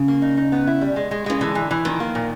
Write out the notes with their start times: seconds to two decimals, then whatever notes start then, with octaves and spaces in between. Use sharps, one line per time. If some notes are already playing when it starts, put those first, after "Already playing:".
Already playing: C#3
0.08 A#3
0.22 D#4
0.37 D#4
0.52 B3
0.67 E4
0.81 G3
0.96 G#3
1.11 G#3
1.26 C#3 G#3
1.41 D3 E3
1.55 E3
1.71 E3
1.85 D#3 F3
2.00 A#3
2.15 A#2